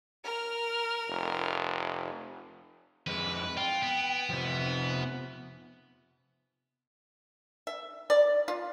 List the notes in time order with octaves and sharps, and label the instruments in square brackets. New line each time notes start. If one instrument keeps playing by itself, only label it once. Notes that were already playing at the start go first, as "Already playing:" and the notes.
[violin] A#4 F6
[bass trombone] F1
[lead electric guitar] F2 G#3 [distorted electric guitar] B4
[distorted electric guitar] F4 [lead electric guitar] G5
[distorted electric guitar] B3
[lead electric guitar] C3 F3
[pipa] E5
D5
F4